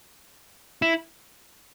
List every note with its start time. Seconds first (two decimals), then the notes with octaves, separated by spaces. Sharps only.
0.82 E4